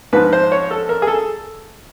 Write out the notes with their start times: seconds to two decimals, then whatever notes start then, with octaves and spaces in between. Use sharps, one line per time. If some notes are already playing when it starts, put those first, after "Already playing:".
0.13 G#2 F3 B4
0.33 C5
0.52 C#5
0.71 A4
0.89 A#4
1.02 G#4
1.07 A4